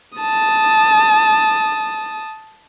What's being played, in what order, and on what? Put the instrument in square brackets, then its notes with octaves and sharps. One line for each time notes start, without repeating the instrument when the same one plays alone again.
[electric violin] A5 D#6